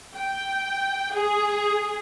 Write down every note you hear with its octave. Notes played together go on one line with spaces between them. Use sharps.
G5
G#4